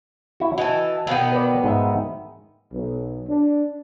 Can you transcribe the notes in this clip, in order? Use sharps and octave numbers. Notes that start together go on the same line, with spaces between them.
E4 F#4
E3 F#4 A4 D#5
B2 D#3 B3 F5
B4 D5
G#2 D#5 E5
B1
D4